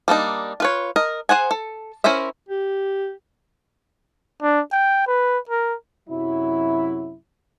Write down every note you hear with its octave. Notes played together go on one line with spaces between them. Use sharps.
G3 A#3 D4 D#4
F4 B4 C#5
A#4 D#5
G#4 C5 F#5 G#5
A4
C#4 E4 A#4 C5 E5
G4
D4
G5
B4
A#4
F#2 C3 F#3 E4